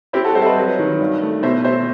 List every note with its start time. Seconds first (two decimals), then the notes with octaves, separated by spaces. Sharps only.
0.13 C4 E4 G4
0.24 F#4 A4
0.35 G3 A4 C5
0.42 E5
0.45 B4 D#5
0.56 F#3
0.79 D#3
1.00 G2
1.22 A3
1.43 B2 C5 E5
1.65 C4 C5 E5